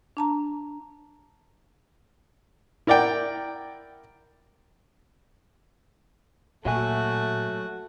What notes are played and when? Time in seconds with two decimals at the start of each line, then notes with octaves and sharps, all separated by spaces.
0.17 D4 A5 A#5
2.87 E4 A#4 D5 F#5 G5
6.65 A#2 F#3 A3 F#4 E5 G#5